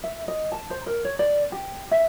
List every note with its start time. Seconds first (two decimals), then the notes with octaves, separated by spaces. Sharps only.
0.04 E5
0.28 D#5
0.52 A5
0.70 C5
0.86 A#4
1.05 C#5
1.19 D5
1.52 G4
1.91 E5